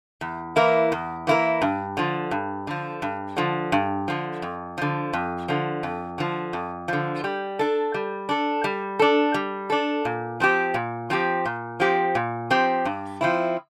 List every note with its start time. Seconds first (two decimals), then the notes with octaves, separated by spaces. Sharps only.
0.21 E2
0.56 E3 A#3 E4 A#4
0.92 E2
1.27 E3 A#3 E4 A#4
1.62 G2
1.97 D3 F3
2.31 G2
2.67 D3 F3
3.02 G2
3.37 D3 F3
3.72 G2
4.08 D3 F3
4.42 F2
4.78 D3 F3
5.13 F2
5.48 D3 F3
5.83 F2
6.18 D3 F3
6.53 F2
6.88 D3 F3
7.24 G3
7.59 D4 A4
7.94 G3
8.29 D4 A4
8.64 G3
8.99 D4 A4
9.34 G3
9.70 D4 A4
10.05 A#2
10.40 F3 C4 G4
10.74 A#2
11.10 F3 C4 G4
11.46 A#2
11.80 F3 C4 G4
12.15 A#2
12.50 F3 C4 G4
12.85 G2
13.21 F3 C4 E4